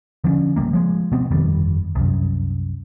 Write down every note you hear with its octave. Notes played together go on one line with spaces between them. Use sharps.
D3 F3 C4 C#4
A#1 C#3 G3 A#3
F3 G#3
B2 F3 B3 C4
G1 F2 D#3 G3
C2 F#2